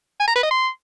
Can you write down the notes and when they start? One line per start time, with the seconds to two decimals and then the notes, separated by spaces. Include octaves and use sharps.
0.20 G#5
0.28 A#5
0.35 B4
0.43 D#5
0.51 C6